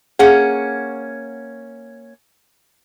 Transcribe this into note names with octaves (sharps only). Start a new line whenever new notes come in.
A#3 C#4 G#4 F#5